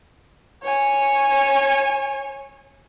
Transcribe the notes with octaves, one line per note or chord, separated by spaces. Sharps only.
C#5 G#5